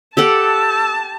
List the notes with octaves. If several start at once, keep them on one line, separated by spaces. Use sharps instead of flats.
G4 A4 F#5 A5 E6